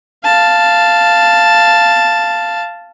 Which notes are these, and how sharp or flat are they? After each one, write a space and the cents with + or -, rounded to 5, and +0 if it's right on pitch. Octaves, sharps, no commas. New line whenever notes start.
F5 -10 A5 +0